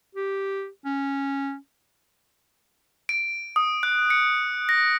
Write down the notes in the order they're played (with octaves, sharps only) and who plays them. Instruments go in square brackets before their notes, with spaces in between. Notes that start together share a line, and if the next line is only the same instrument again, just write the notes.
[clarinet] G4
C#4
[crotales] D7
D#6
F#6
C#7
A#6